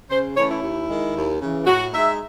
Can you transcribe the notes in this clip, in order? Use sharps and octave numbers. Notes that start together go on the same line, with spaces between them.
C#3 C5
E3 A3 C#4 C#5
E4
D#2
D#3 G#3
D#2
C#3 E3
A2 F#4
G#3 D#4 E5